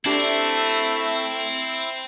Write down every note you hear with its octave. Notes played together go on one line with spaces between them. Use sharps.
A3 C4 D4 E4 G4